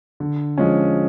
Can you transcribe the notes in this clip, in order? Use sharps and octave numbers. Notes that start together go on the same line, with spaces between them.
D3
F3 G#3 C#4